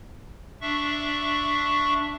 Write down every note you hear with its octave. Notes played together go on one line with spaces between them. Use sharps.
D4 E5 C#6